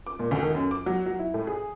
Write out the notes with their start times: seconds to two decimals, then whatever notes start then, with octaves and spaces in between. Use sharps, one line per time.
0.07 D6
0.19 A#2
0.31 D2
0.43 D#3
0.55 F#2
0.71 D6
0.86 F#3
1.06 F#3
1.19 E4
1.34 A2
1.47 G#4